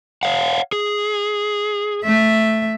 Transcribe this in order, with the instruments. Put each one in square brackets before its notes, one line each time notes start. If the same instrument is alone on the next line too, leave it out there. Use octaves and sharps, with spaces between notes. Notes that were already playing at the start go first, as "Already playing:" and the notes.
[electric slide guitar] C#5 F5 F#5
G#4
[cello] A3 E5